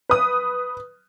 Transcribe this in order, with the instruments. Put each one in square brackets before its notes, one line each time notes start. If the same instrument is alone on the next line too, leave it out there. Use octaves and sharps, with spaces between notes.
[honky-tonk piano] B4 D#6